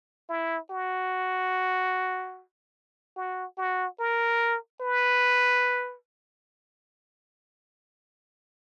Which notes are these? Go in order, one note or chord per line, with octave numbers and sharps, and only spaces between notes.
E4
F#4
F#4
F#4
A#4
B4